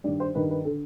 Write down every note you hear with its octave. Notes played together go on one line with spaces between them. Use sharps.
G2 D#3 D5
C5
G2 D#3 B4
B4
D3 A4